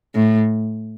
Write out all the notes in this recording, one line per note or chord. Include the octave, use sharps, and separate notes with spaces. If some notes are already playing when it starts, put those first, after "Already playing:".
A2